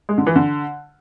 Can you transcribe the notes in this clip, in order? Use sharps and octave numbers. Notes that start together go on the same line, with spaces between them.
G#3
D3
E3
D3